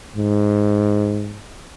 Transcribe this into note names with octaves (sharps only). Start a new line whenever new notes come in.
G#2